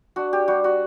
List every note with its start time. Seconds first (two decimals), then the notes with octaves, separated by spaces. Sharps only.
0.16 D4 F#4
0.33 G4
0.48 G3 F#4
0.64 F#4